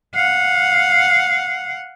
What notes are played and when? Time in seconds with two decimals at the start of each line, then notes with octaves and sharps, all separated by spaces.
0.15 F5 F#5